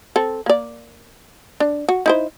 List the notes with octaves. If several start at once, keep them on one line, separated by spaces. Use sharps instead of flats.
C4 A4
A#3 D5
D4
F#4
D#4 E4 C5